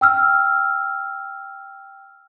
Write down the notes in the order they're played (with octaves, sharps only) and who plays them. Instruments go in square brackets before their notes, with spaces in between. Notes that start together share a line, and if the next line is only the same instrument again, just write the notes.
[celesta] G5 E6 F6